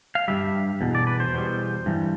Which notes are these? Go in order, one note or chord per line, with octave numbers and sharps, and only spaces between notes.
F5
G2 E3 G3 E5
E2 B2
D5
B4
C5
E2 B2 G3
G2 E3 G3